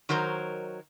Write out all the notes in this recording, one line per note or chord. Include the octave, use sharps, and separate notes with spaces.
D#3 F#3 A#4 C5